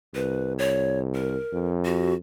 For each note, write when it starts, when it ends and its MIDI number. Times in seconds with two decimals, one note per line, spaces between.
0.15 1.37 36
0.15 0.53 71
0.59 0.99 73
1.15 1.69 70
1.53 2.16 41
1.85 2.14 66